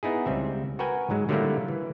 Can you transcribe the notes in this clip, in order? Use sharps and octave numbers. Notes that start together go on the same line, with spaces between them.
B3 D#4 E4 G#4
C#2 G3 C4 E5
F#4 A#4 B4 G5 G#5
G#2 F#3 G#3
D3 F#3 G3 A3 A#3 E4
E3